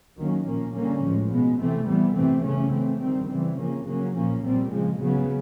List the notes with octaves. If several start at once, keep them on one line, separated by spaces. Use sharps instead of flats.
D#3 F#3 A#3 C#4
A#2 F3 A#3 C#4
D3 G3 A#3 C#4
A2 F3 G#3
B2 G#3 B3
C3 E3 A3 C4
E3 G3 B3
C3 E3 A3 C4
C#3 E3 A3 C#4
E3 A3 C4
D#3 G3 C4
C#3 E3 G3 C4
C#3 F3 A#3 C#4
C#3 F#3 A#3 C#4
A#2 F3 A#3 C#4
A#2 G3 C4
C#3 F3 G#3
C#3 F#3 B3